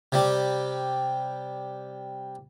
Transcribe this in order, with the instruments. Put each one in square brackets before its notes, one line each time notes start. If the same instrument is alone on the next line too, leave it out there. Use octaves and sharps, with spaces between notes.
[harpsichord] C3 G3